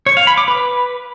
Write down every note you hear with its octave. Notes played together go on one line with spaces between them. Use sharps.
C#5
F5
B5
D6
B4